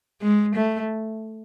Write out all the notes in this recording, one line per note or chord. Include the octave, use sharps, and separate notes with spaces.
G#3
A3